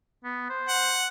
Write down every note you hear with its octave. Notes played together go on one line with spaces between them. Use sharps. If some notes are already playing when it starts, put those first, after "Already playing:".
B3
C5
F#5